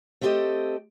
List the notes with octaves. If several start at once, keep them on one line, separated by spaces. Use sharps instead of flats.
A3 B3 C4 G4 A4 D#5